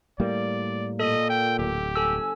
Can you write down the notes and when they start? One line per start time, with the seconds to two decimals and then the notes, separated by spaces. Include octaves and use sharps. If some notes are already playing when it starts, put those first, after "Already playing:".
0.20 A2 G3 A#3 D5
1.00 A#2 A4 D#5
1.29 G5
1.59 D1 G4
1.96 G1 A4 G#5 E6